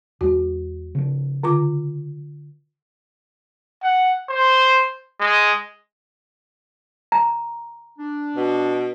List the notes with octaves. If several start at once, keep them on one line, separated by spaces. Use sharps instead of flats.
E2 G#3 F#4
C#3 F3
D3 F4 D6
F#5
C5
G#3
A#5
D4
B2